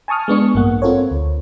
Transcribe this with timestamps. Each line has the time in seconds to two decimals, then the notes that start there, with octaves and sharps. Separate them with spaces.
0.08 G#5 A5 C#6 D#6 F6
0.28 G#3 B3 D4 C#6
0.54 A1 G2 A#3 F#5
0.82 C4 F4 A4 A#4 C#5
1.11 D2